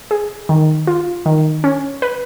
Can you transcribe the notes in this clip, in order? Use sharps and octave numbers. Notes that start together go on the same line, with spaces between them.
G#4
D#3
F4
D#3
C#4
B4